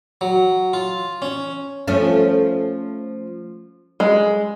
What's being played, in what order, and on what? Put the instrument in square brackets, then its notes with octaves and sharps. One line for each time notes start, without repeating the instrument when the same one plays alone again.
[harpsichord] F#3
F4
C#4
[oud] F3 A3 C#4
[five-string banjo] G#3